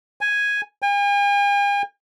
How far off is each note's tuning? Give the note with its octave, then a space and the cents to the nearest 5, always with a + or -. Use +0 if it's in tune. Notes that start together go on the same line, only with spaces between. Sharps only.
G#5 +0
G#5 -45